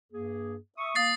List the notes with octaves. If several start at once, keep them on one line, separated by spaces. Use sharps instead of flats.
G2 A#3 G#4
E5 C#6 D#6
A#3 D#6 A6 C7